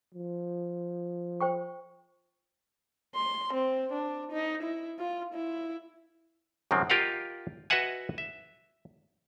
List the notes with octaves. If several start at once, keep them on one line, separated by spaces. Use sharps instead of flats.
F3
C5 G5 C#6
C6
C4
D4
D#4
E4
F4
E4
F#2 C3 D#3 F3 G#3 C4
F4 G4 A#4 D#5 F5 F#5
F#4 B4 D#5 E5 F#5 G#5
E5